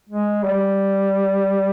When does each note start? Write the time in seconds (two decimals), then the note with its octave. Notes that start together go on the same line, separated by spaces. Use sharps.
0.09 G#3
0.43 G3